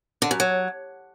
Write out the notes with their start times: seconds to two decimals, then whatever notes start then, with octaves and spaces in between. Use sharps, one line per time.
0.22 D3
0.31 F#2
0.40 F#3